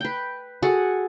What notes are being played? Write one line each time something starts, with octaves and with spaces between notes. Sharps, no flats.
B4 G5
F#4 G#4 A4 F#5